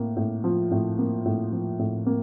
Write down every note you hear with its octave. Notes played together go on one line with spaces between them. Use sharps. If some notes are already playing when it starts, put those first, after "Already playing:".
Already playing: A2 A#3
A2
F3
A2
A#3
A2
F3
A2
A#3